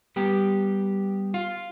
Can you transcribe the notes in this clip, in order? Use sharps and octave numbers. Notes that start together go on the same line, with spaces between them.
G3 B3 G4
F4